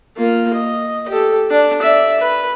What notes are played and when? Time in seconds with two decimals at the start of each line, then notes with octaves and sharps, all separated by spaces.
0.17 A#3 F4
0.54 D#5
1.08 G4 A4
1.51 D4
1.81 D5 E5
2.20 B4